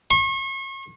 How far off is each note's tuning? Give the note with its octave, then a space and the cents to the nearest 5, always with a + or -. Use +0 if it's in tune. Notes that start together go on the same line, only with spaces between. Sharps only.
C#6 -40